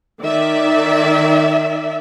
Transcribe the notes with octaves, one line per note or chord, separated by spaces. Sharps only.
D#3 D5 E5